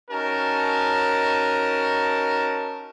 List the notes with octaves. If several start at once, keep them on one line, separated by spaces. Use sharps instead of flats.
C#4 D#4 F#4 A#4 A5